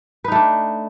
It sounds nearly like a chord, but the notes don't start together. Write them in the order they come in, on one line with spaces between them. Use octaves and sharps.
B4 D#4 A3 D4